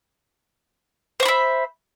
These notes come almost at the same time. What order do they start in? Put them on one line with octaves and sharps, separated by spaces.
C5 C#6 B5 E5